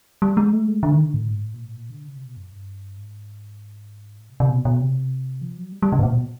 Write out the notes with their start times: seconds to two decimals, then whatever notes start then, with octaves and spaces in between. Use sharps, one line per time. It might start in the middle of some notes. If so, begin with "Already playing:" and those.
0.22 G3
0.37 G#3
0.53 A3
0.68 G#3
0.83 D3
0.93 D#3
1.03 D3
1.14 A2
1.29 G#2
1.44 A2
1.54 A#2
1.65 A2
1.75 A#2
1.90 D3
2.05 C#3
2.16 C3
2.26 B2
2.37 F#2
2.51 G2
2.98 G#2
4.19 A2
4.30 C3
4.40 C3
4.49 B2
4.65 B2
4.81 C3
5.41 F3
5.57 F#3
5.72 G3
5.82 G3
5.92 C#3
5.99 A2
6.03 A#2
6.13 B2